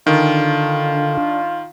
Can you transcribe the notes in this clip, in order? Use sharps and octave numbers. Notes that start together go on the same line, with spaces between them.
D3 D#3 D4 F4